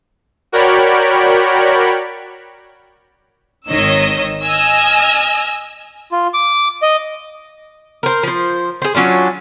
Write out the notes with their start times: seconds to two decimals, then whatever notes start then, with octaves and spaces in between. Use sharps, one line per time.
0.52 F#4 A#4 C#5 D5 G5 B5
3.69 G#1 D#3 C#5 D#5 E6
4.45 D#5 G#5 E6 F6
6.12 F4
6.34 D6
6.82 D#5
8.03 A#4 C5
8.23 F3 C5
8.82 G#4 C5
8.95 F#3 C#4 D4 F4